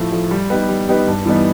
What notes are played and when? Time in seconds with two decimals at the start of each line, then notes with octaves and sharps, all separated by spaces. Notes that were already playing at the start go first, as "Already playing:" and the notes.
Already playing: A2 F3 A3
0.12 F3 A3
0.31 G3
0.50 B3 D#4 G4 B4
0.69 G3
0.88 B3 D#4 G4 B4
1.07 G2
1.26 E3 G3 B3 D#4